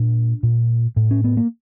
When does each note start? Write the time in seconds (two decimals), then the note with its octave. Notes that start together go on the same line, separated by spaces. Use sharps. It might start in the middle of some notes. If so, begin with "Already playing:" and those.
Already playing: A#2 D4
0.43 A#2
0.96 A2
1.11 C#4
1.24 B3
1.37 A#3